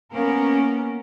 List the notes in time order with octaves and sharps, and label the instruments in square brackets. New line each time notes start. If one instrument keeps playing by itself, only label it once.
[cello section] A#3 B3 C#4 A#4